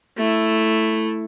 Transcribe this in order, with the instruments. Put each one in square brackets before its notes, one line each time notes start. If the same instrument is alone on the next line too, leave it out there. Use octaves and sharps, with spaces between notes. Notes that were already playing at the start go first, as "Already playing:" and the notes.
[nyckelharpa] A3 E4